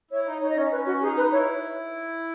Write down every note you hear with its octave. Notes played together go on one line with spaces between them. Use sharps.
E4 C#5
D#4
D#4 C#5
D#5
C#4 C#5
C#4 B4
F#4
D#4 G#4
B4
E4 C#5